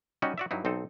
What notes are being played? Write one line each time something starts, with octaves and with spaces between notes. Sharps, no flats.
G3 C#4 D#4 F#4 D#5
F#4 D5 E5
G2 F#3 D#4 E4
B1 C4 D#4 A4